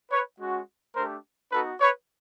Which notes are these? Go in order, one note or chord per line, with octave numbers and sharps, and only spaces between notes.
B4 C#5
G#3 C#4 F#4
A3 D4 G4 A#4 C5
B3 D#4 F#4 A4 B4
B4 C#5